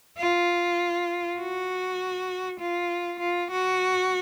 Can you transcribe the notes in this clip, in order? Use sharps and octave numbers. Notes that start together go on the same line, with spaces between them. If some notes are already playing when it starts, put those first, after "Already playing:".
F4
F#4
F4
F4
F#4